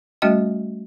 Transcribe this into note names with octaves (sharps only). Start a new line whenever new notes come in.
G3 A3 C#4 F#4 D#5 G5